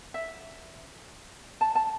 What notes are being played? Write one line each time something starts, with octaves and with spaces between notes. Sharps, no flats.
E5
A5
A5